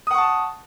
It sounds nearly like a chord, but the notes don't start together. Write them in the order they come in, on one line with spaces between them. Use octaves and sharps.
D#6 F#5 C#6 A5